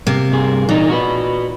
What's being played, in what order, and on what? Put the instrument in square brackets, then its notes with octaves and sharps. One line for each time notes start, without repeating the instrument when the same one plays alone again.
[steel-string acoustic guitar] C3 A#3
[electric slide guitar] G2 G#4
[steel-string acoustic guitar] A#2 [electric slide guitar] E3 D#4
[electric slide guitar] F#4 B4